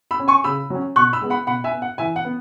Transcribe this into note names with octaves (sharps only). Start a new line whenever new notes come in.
B5 E6
C#4
G#5 C#6
C#3 B5 E6
F#3 C#4
B2 C#6 F#6
B5 E6
G#3 B3
F#5 B5
B2 F#5 B5
E5 G#5
B3
F#5
E3 E5 G#5
F#5
B3